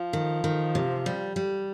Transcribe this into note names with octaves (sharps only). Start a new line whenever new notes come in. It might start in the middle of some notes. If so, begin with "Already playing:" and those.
Already playing: F3
D#3
D#3
C3
G3
G3